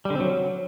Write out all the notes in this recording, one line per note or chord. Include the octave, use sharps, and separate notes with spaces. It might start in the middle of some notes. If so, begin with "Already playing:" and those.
G3
D3
C4
F#3